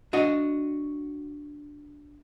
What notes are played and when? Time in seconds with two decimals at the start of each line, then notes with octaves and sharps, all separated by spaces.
0.13 D4 F#4 D#5